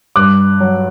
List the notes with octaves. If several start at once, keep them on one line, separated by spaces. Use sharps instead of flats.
G2 D6 F#6
F#3